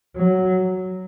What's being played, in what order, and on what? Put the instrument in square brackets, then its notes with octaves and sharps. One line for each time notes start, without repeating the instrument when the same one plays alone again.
[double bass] F#3